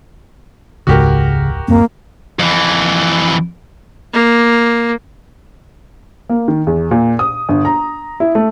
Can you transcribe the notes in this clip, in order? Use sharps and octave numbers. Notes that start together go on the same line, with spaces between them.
E1 C#2 G#2 C#3 F#4 G4 A#4
D1 F#2 A#3 C4
F2 E3
A#3
A#3
D#3
E2
A#2
D#6
G1
A#5
E4
A3